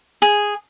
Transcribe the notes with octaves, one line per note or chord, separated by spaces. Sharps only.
G#4